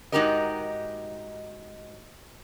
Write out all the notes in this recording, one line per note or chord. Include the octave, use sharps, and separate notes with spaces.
G#2 D#4 F#4 G4 A#4 D#5